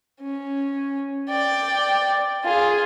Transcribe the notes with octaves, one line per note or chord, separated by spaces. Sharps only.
C#4
D5 G5
F4 G#4